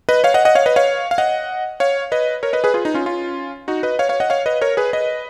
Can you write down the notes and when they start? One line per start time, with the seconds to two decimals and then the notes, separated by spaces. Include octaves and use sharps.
0.09 B4 D#5
0.24 C#5 F5
0.34 D#5 F#5
0.45 D#5 F#5
0.55 C#5 F5
0.66 B4 D#5
0.76 C#5 F5
1.11 F5
1.18 D#5 F#5
1.80 C#5 F5
2.12 B4 D#5
2.43 A#4 C#5
2.53 B4 D#5
2.64 G#4 B4
2.74 F4 G#4
2.85 D#4
2.94 C#4 F4
3.06 C#4 F4
3.68 D#4 F#4
3.83 B4 D#5
3.99 C#5 F5
4.09 C#5 F5
4.20 D#5 F#5
4.30 C#5 F5
4.46 B4 D#5
4.61 A#4 C#5
4.77 G#4 B4
4.93 B4 D#5